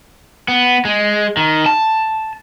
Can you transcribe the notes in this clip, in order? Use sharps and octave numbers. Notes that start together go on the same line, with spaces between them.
B3
G#3
D#3
A5